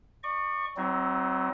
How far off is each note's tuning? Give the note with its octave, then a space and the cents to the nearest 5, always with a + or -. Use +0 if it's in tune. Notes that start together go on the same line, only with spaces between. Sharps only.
D5 +40 C#6 +0
F#3 +30 C4 +0 E4 -45